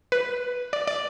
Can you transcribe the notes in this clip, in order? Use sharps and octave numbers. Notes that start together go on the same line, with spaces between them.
B4
D5
D5